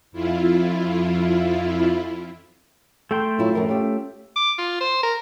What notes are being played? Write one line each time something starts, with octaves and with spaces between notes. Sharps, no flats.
F2 E4 F4
A3 A4 G5 C6
F#3 E4 F4
F#2 F3 A#4
C#4 F4 G4
D6
F4
C5
A#4